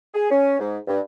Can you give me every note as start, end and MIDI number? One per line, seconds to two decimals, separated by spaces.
0.14 0.28 68
0.30 0.56 61
0.59 0.77 44
0.87 0.99 43